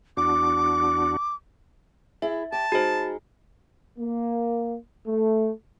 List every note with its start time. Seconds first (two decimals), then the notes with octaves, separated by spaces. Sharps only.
0.17 E2 D4 F#4 D6
2.22 E4 G#4 E5
2.52 G4 A5
2.72 G#3 D#4 F#4 G#4 C5
3.99 A#3
5.07 A3